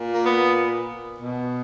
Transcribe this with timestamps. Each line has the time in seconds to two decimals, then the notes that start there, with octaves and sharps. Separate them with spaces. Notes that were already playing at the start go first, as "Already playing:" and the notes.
Already playing: A#2
0.13 A#3
0.25 B3
1.21 B2